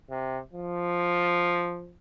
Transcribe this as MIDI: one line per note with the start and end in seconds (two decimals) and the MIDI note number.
0.10 0.39 48
0.53 1.95 53